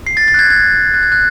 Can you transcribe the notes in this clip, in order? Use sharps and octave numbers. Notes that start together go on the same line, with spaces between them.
C7
A6
A6
F#6
G#6
G#6
F#6
G#6
F#6